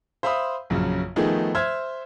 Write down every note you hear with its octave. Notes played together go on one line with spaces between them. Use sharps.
C5 E5 F5 B5 C6 D#6
A#1 F#2 C#3
D#3 F3 A3 B3 D#4 G#4
C5 E5 F6 G#6